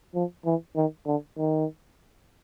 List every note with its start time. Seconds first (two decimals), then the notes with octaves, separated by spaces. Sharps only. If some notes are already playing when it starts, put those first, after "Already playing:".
0.15 F3
0.45 E3
0.76 D#3
1.06 D3
1.38 D#3